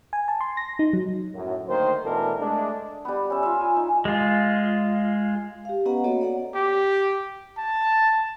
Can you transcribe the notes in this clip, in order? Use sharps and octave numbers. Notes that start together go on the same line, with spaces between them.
G#5
A5
C6
A#6
D#4
F#3
F#2 A2 F#3
D2 D#3 A#3 C5
B2 E3 A3 D4 A4 A#4
G#3 A3 D4
G3 B3
C#4 E5
F4 E5
G#5
D#4
G#3 F4
G4 F5
B3 C#4 B4 D#5 F#5 A#5
A#3 B3 F#4 A4 C#5 D#5
D5 F#5 A#5
G4
A5